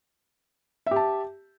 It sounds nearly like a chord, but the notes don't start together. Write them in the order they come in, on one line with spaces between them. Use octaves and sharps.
E5 G4 A5